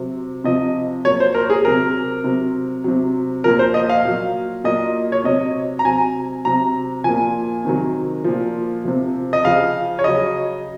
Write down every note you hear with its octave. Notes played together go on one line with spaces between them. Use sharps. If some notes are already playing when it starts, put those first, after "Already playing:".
Already playing: C3 F#3
C3 F3 D#5
A#2 F#3 C#5
C5
A#4
G#4
C3 F#3 A#4
C3 F#3
C3 F#3
A#2 F3 A#4
C5
D#5
F5
A#2 F#3
A#2 F#3 D#5
C#5
C3 F#3 D#5
A#5
C3 F#3 G#5
C3 F#3 A#5
A#2 F3 G#5
C3 D#3 F#3
A#2 F3
C3 F3
D#5
C#3 F3 F5
C#5
C#3 F#3 D#5